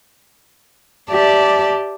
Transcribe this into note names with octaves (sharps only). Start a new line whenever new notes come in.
G4 D5 E5 A5